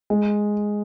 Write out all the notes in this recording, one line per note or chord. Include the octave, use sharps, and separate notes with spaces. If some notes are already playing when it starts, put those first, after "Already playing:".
G#3